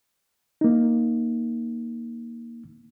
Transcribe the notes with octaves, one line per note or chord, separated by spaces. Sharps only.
A#3 D#4